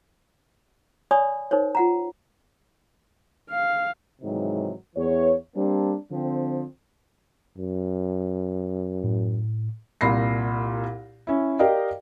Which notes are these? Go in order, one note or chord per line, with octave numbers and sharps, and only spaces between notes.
C#5 D5 G#5 B5 C#6 D#6
D#4 A#4 C5 C#5
F4 F#5 A#5
F5
G#2 C3 D#3 E3 F#3
E2 E3 C#5
G3 A#3 C4 D4
D3 F3 C4
F#2
A2
C2 A#2 B5 A#6 C7
C#4 E4
G4 A#4 D5 D#5 F5 G5